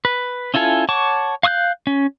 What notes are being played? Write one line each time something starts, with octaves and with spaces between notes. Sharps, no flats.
B4
C#4 E4 F4 A4 G#5
C#5 F#5 A5 C#6 D6
F5 C#6 D#6 F#6 G6
C#4